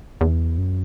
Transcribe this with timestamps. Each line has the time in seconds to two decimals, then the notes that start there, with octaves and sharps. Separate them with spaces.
0.21 E2
0.58 F#2